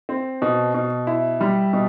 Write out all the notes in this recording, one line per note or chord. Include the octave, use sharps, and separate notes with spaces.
C4
B2
B2
E4
G3
B2